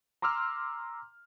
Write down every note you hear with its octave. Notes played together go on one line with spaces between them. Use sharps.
A#5 C6 D6 E6 F6